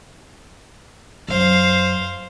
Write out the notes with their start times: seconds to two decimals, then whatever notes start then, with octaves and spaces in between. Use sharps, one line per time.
1.28 F#2 C5 F5